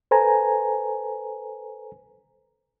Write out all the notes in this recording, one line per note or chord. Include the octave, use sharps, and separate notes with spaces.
A4 B4 C5 G#5 A#5